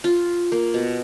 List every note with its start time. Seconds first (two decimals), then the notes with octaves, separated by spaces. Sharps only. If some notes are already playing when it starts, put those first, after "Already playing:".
0.04 F4
0.52 A#3
0.74 B2